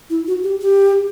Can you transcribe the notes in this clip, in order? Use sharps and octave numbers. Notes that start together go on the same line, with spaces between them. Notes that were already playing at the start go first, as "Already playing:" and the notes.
E4
F#4
G4
G4